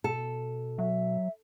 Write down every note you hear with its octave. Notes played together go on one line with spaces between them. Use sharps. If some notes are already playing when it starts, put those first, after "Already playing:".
B2 A4
F#3 E5